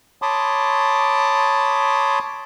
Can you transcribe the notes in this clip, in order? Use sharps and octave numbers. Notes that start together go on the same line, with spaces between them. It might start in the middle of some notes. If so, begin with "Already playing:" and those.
C#5 A5 B5 C6 D6 D#6